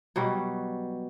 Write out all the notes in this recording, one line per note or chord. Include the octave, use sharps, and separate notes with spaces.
B2 F#3 G3